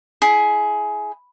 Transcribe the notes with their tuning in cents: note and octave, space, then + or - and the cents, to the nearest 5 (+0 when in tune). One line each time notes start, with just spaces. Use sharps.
E4 +0 G#4 +20